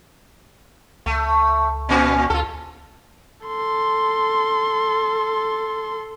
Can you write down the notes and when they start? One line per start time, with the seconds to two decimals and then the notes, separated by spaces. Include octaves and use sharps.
1.06 C#2 A3
1.89 A#2 C#4
2.30 D2 F4 A4
3.46 A4 C6